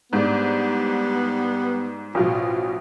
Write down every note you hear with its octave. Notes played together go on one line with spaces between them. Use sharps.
G#2 G3 B3 D4
A1 B2 F3 F4